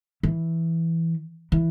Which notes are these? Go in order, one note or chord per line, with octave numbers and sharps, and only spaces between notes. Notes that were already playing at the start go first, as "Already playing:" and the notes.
E3
E3